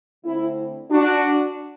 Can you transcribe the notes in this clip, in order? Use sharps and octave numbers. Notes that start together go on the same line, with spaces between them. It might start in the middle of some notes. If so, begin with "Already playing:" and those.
D3 A3 C4 E4
D4 F#4